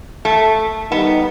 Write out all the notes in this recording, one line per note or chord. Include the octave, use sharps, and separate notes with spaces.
A3
G3 B3 D#4